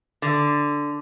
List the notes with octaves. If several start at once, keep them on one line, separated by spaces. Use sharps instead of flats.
D3